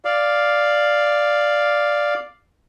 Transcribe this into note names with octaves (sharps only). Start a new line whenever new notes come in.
D5 F5